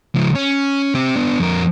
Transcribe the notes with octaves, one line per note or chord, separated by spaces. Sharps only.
C#2 F3
C#4
C4 G4
B3 D4
F2 A#4